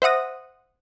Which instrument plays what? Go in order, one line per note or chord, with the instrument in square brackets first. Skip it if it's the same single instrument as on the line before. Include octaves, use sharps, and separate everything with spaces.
[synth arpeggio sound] C5 E5 F#5 D#6 A#6